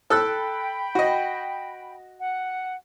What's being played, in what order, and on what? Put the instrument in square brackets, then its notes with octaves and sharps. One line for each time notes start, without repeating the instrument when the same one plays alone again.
[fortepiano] A4 E6 F#6 [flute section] G5 B5
[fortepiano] F#4 D#5
[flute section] F#5